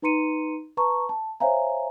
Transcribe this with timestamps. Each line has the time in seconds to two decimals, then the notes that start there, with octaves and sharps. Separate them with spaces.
0.02 D#4 B4 A#5 C6 C#7 D#7
0.77 B4 A5 A#5 C#6
1.09 A5
1.40 C5 C#5 E5 F5 G#5 A#5